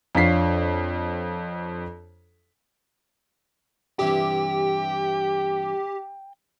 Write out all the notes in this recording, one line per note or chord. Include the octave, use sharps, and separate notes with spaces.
F2 D4 F4 C#5 B6 C7
G2 C3 E3 G4 G5